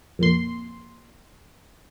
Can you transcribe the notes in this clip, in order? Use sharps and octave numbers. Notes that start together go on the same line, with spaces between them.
F2 A#2 C6